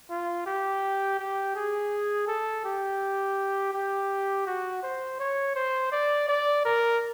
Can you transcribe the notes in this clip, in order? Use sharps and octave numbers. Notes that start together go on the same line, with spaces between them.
F4
G4
G4
G#4
A4
G4
G4
F#4
C5
C#5
C5
D5
D5
A#4